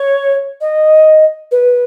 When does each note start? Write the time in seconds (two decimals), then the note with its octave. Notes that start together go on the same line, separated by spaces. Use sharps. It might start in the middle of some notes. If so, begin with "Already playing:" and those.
Already playing: C#5
0.60 D#5
1.51 B4